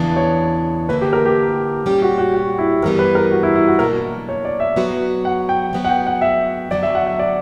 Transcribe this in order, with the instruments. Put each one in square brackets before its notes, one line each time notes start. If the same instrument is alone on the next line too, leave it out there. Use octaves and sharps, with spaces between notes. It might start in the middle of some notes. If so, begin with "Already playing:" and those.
Already playing: [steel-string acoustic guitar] E2 C#3 E3 B3 D4
[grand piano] C#5
[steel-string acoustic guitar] D3 A#3 E4 [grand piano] B4
[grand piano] G4
A#4
G4
[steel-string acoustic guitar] A#2 G3 C#4 G4
[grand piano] F#4
F#4
F#4
E4
[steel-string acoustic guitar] G2 E3 G3 B3 [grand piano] A#4
[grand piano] B4
A#4
F#4
E4
E4
F#4
[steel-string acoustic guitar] B2 F#3 A#3 D4 [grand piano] A#4
[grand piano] C#5
D5
E5
[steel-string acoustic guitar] F#3 B3 F#4 B4
[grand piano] F#5
G5
[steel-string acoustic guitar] F#3 B3 F#4 B4
[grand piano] F#5
G5
F#5
E5
[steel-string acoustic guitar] D3 F#3 B3 F#4 [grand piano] D5
[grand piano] E5
F#5
E5
D5